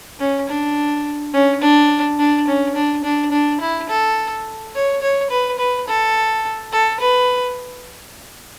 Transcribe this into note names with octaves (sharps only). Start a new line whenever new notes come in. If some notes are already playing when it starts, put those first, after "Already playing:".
C#4
D4
C#4
D4
D4
C#4
D4
D4
D4
E4
A4
C#5
C#5
B4
B4
A4
A4
B4